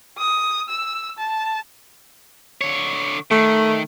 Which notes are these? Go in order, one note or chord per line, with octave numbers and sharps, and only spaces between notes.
D#6
E6
A5
D3 C#5
D#3 A3